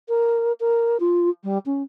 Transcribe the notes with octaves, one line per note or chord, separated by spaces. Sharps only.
A#4
A#4
F4
G3
C#4